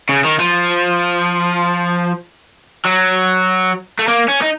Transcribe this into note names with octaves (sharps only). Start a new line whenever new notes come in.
C#3
D#3
F3
F#3
A3
A#3
C#4
D#4